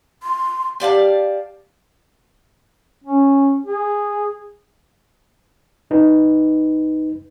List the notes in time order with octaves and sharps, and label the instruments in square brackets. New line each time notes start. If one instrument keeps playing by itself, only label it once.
[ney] C6
[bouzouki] G4 D5 F5 A5
[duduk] C#4
G#4
[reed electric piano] C2 D#4 B4